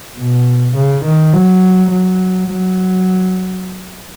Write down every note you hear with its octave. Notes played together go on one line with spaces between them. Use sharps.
B2
C#3
D#3
F#3
F#3
F#3